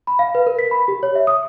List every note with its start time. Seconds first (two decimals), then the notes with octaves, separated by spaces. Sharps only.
0.07 B5
0.19 F5
0.35 B4
0.47 A#4
0.59 B6
0.71 B5
0.88 G4
1.03 C#5
1.15 E5
1.27 D#6